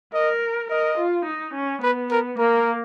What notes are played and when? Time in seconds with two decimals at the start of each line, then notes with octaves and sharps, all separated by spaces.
0.14 A#4 D#5
0.70 A#4 D#5
0.98 F4
1.26 D#4
1.54 C#4
1.82 B3 B4
2.11 A#4
2.39 A#3 A#4